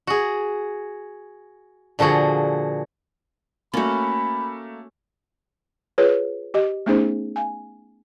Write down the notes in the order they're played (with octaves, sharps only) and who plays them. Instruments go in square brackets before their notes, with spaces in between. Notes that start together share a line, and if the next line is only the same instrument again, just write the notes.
[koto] F#4 G#4
A#2 D3 F3 F#4 G#4
[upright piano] A3 A#3 [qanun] C#4 F#4 [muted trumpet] B5
[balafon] F4 G#4 B4 C#5
G4 D#5
A3 B3 C#4 D#4 G#4 C5
F5 G#5